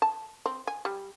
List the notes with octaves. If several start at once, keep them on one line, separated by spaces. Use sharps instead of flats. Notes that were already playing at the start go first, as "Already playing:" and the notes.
A5
C4
G#5
G3